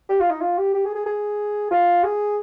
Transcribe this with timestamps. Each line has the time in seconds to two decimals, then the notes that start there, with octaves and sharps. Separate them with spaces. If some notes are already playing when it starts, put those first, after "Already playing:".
0.09 G4
0.20 F4
0.30 D#4
0.41 F4
0.58 G4
0.74 G4
0.85 G#4
0.95 G#4
1.06 G#4
1.71 F4
2.04 G#4